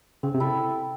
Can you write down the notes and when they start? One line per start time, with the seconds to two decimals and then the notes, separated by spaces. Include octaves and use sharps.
0.23 C#3 C4
0.34 C3
0.40 E4 A4